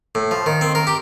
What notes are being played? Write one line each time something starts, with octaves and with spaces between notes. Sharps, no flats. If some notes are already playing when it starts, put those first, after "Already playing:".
A2
F3
D#3
C4
A#4
G4